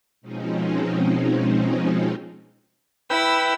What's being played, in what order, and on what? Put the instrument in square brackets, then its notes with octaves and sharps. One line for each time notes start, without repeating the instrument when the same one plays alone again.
[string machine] B2 F3 G#3 C4 C#4 D#4
[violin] E4 E6 [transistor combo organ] B4 G5